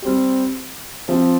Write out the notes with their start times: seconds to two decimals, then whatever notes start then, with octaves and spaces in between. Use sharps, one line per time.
0.02 G3 C4 G4
1.08 F3 C4 F4